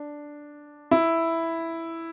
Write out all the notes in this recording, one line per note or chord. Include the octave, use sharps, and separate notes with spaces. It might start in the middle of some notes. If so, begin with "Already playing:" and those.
Already playing: D4
E4